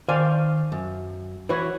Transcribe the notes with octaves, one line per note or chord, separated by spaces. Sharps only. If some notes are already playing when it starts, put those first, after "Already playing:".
D#3 C5 D5 F5 G#5
F#2
E3 F#4 B4 C#5